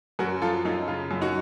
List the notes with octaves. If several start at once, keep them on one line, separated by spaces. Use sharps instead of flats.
F#2 F#4 A#4
F3 F4 A4
F#2 D#4
C#3 F4
F#2
D#4 F#4